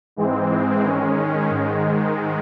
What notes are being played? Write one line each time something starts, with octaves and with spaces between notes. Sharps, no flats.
G#2 E3 G#3 C4
D#3 G#3 C#4
G#2 D#3 G#3